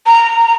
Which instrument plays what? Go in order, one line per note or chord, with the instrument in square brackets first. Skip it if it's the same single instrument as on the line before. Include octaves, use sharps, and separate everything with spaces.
[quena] A#5